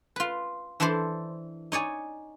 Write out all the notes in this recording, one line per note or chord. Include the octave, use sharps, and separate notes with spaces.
F4 B4
E3 D4 E4 A4 C5
D#4 C#5 D5 G#5